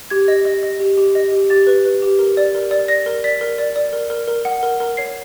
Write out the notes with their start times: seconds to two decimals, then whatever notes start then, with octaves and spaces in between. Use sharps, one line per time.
0.10 G4 G#6
0.28 D#5
0.45 D#5
0.63 D#5
0.80 G4
0.97 G4
1.15 D#5
1.32 G4
1.50 G4 A6
1.67 B4
1.85 B4
2.02 G4
2.19 A#4
2.37 D5
2.55 A#4
2.71 D5
2.88 D5 A#6
3.06 A#4
3.24 D5 B6
3.41 A#4
3.58 D5
3.76 D5
3.93 A#4
4.10 A#4
4.28 A#4
4.45 F#5
4.63 A#4
4.80 A#4
4.97 C#5 C7